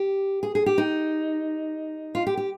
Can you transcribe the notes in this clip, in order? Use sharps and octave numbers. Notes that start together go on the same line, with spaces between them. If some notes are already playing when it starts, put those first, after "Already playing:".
Already playing: G4
G#4
G#4
G4
D#4
F4
G4
G4